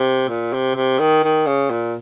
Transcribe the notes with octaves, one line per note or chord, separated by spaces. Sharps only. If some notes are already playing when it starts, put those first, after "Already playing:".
Already playing: C3
A#2
C3
C3
D#3
D#3
C#3
A#2